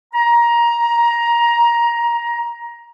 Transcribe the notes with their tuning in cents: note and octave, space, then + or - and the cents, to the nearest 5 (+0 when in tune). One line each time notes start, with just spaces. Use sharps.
A#5 +15